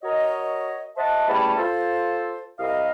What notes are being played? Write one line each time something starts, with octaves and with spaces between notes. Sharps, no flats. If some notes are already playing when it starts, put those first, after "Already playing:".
F#4 A#4 C#5 D#5
C5 D#5 E5 F#5 A5
E2 G3 A3 C#4 A5 B5
F4 A4 C5
C2 D#5 F5